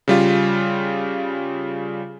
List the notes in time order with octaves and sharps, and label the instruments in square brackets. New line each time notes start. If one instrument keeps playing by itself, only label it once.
[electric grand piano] C#3 G3 F4